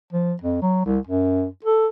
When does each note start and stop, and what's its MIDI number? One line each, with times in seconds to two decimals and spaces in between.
0.13 0.33 53
0.42 0.61 41
0.62 0.85 54
0.85 0.99 36
1.07 1.47 42
1.64 1.87 69